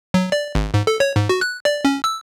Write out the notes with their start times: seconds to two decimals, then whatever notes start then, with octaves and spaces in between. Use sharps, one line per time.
0.14 F#3
0.32 D5
0.55 G#1
0.74 G#2
0.87 A4
1.00 C#5
1.16 G#2
1.29 F#4
1.41 F#6
1.65 D5
1.85 C#4
2.04 E6